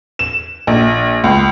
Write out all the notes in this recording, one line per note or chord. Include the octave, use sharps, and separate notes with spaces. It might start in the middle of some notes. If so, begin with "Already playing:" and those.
E7
A#1
C#2